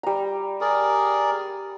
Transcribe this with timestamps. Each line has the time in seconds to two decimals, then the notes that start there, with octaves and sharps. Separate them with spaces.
0.03 G3 A#5
0.61 G#4 A#4 D5